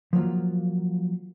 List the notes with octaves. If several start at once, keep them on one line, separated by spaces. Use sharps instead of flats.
F3 F#3 A#3 F4